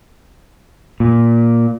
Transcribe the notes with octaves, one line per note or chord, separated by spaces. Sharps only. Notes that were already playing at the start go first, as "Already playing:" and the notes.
A#2